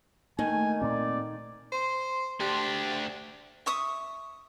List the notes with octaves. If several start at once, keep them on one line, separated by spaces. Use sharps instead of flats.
D#3 A3 A#3 G#5
A#2 C4 D5
C5 C6
D2 D4 G4
E5 C#6 D#6